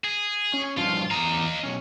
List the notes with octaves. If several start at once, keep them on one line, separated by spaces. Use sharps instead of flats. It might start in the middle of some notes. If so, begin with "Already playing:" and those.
G#4
C#4
G2 F3 F4
E2 D#5 F5 A#5
B1 C#4